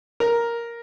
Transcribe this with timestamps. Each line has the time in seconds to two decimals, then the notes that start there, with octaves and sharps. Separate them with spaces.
0.20 A#4